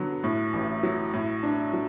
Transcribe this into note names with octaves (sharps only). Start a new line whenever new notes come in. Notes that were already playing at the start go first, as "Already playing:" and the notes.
Already playing: D3 F#3 B3
A2
A1
F#3
A2
D4
F#3